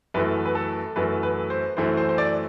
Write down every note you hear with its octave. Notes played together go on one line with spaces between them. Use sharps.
F#2 E3 A3 B4
B4
A4
F#2 E3 A3 B4
B4
C5
F#2 E3 A3 C5
C5
C5
D5